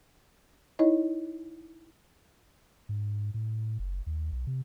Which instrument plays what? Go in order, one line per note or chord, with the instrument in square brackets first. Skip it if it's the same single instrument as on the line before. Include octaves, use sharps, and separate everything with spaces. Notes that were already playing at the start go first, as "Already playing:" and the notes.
[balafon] D#4 E4 C#5 D#5
[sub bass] G#2
A2
F#1
D#2
B1
C3